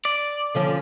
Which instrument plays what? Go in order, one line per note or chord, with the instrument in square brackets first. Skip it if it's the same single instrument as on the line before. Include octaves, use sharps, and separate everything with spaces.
[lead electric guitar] D5
[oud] D3 F3 C#4